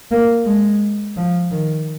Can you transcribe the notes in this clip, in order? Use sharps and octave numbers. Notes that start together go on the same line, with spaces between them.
A#3
G#3
F3
D#3